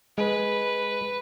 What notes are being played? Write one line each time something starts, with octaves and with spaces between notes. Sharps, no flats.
G#3 B4